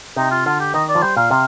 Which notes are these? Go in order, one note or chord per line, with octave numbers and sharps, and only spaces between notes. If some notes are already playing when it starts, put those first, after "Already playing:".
C3 D#4
F4
D3 F4
G4
D#3 D#5
D5
F3
G3 C5
A#2 F5
C3 F5